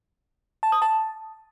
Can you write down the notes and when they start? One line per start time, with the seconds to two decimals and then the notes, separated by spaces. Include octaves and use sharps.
0.63 A5
0.72 D#6
0.82 A5